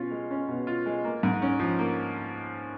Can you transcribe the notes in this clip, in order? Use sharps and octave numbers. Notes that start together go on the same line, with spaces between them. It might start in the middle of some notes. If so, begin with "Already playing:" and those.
Already playing: B2 C#4 F4
G#3
C#4
B2
F4
G#3
A#3
G#2
C#4
F3
A#3